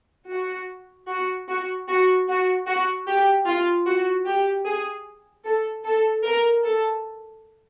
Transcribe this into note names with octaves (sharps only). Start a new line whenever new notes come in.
F#4
F#4
F#4
F#4
F#4
F#4
G4
F4
F#4
G4
G#4
A4
A4
A#4
A4